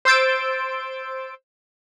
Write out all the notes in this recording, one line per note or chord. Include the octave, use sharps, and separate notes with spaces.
C5 C6 E6 G6 A6 D7